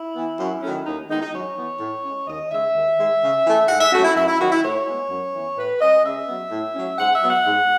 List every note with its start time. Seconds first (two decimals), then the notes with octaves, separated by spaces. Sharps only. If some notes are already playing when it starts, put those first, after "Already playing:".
Already playing: E4
0.15 E3 B3
0.39 F#2
0.62 D#3 F#3 A3 C#4
0.86 D#2 D#4
1.09 D#3 G#3 B3 D#4
1.21 D#4
1.33 F#2 C#5
1.57 E3 B3
1.80 A2
2.04 G#3 C#4
2.27 D#2 D#5
2.51 C#3 G#3 E5
2.75 D#2
2.98 D#3 G#3
3.22 C#3
3.45 E3 A3
3.69 G#2 F#5
3.80 E5
3.92 F#3 A3 C#4 F#4
4.04 E4
4.15 F#2 E4
4.28 E4
4.39 D#3 F#3 F#4
4.51 E4
4.63 A2 C#5
4.87 G#3 B3
5.10 F#2
5.34 E3 B3
5.57 A2 B4
5.80 G#3 C#4 D#5
6.04 C#3 E5
6.27 F#3 B3
6.51 A2
6.75 F#3 C#4
6.98 G#2 F#5
7.14 E5
7.22 F#3 B3
7.30 F#5
7.46 G#2